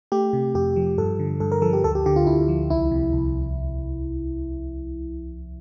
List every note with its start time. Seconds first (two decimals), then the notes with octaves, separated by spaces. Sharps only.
0.12 A3 G4
0.33 C3
0.55 F2 G4
0.76 F3
0.98 G2 A4
1.19 D3
1.40 G2 A4
1.52 A#4
1.62 F3 A4
1.73 G4
1.84 D2 A4
1.95 G4
2.06 D3 G4
2.16 F4
2.26 D2 E4
2.48 F3
2.70 C2 E4
2.91 C3
3.13 C2